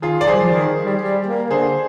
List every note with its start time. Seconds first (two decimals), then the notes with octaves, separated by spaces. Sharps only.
0.02 D#3 F4 G#4
0.21 D5
0.27 G3 G#4 C5
0.40 F3
0.52 D#3
0.85 G3
1.02 G3
1.27 A#3
1.51 D3 G#4 C5